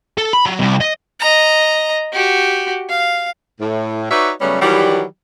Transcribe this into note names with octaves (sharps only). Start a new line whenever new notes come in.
A4
B5
F#3
C2
D#5
D#5 A#5
F#4 G4
F5
A2
D#4 F#4 B4 C#5 D5 E5
C#3 F#3 G3 A3 B3 C#4
D#3 E3 F#3 G3